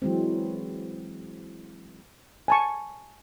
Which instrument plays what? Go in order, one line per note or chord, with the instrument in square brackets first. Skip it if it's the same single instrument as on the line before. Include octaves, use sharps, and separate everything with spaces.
[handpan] E3 F#3 G#3 C4
[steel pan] G#5 A5 C#6